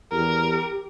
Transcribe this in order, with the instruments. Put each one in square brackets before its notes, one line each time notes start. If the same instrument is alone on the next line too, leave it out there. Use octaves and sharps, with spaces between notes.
[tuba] E2 [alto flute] G4 [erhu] A#4